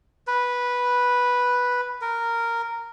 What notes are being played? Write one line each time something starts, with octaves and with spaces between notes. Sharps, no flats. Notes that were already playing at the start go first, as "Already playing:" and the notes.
B4
A#4